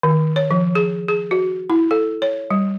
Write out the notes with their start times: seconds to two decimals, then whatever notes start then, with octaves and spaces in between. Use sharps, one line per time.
0.03 D#3
0.36 C#5
0.51 F3
0.75 G#4
1.08 G#4
1.31 F#4
1.70 E4
1.91 A4
2.22 C#5
2.50 G3